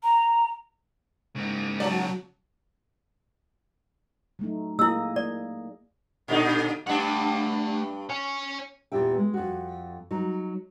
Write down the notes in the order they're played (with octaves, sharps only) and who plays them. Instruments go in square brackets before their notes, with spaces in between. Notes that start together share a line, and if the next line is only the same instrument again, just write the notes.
[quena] A#5
[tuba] G#2 [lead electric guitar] C#3 A#3
[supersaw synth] F#3 [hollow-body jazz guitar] D5 A5
[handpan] F#3 A3 D#4
[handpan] A#3 G#4 D#5 [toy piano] E4 E6
[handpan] A#3 [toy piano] D5
[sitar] A#2 D3 D#4
[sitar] G2 D4 [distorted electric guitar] A3 F#5
[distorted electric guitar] C#5 G#5
[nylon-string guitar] E2 A#2 E3 G4 E5 G5
G#3
F2 F#4
F#3 D#4